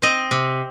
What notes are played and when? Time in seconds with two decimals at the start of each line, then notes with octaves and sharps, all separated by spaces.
0.02 C4 C5 D#5
0.31 C3